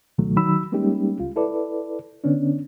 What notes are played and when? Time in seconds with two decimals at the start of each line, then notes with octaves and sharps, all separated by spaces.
0.18 C#2 B2 D#3 F#3 A3
0.37 D#3 F#3 D#4 B5 E6
0.72 G3 G#3 A#3 C#4 D#4 G4
1.20 C#2 F4
1.36 E4 A4 B4 D5
2.24 D3 B3 C#4 D4